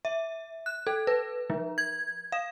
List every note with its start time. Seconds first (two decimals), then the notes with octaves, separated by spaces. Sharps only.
0.05 E5
0.66 F#6
0.87 A4
1.07 B4
1.50 F3
1.78 G#6
2.32 F5